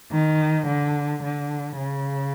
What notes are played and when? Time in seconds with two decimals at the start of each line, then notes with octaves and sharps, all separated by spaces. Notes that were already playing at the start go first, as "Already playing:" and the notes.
0.12 D#3
0.67 D3
1.22 D3
1.77 C#3